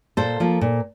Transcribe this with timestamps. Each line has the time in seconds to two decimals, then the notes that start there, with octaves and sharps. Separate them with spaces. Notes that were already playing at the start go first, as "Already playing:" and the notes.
0.17 A#2 A4 C5
0.40 F3 A#3
0.61 A#2